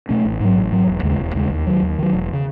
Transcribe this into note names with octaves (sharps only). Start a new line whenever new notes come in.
B2 A3 C#4
A1
G#2 F#3
A1
G#2 F#3
E1
D#2 C#3 G#3
E1
D#2 C#3 G#3
D#2
D#3 F#3
D#2
D#3 F#3
E1
C#3